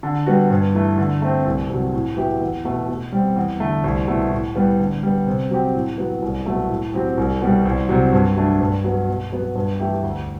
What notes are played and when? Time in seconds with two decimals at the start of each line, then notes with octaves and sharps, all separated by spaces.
0.03 D3
0.27 G3 B3 F#4
0.51 G2
0.75 E3 A3
0.98 D3
1.22 A3 C4
1.46 C2
1.69 C3 F#3
1.93 A2
2.17 F#3 B3 E4 G4
2.41 E2
2.65 B2 A3
2.88 B2
3.12 G3 C4
3.36 E2
3.60 D3 A3
3.84 C2
4.08 B2 A3 E4
4.31 A2
4.56 G3 B3
4.79 D3
5.03 G3 B3
5.27 C3
5.51 F#3 C4 G4
5.75 A2
5.98 F#3 B3
6.22 C2
6.46 B2 F#3 A3
6.70 A2
6.94 F#3 C4 G4
7.18 C2
7.41 B2 G3
7.65 C2
7.89 C3 F#3
8.12 G2
8.36 F#3 A3 D4
8.61 G2
8.84 F#3 B3
9.08 B2
9.32 F#3 B3
9.55 G2
9.79 E3 A3 E4 G4
10.03 D2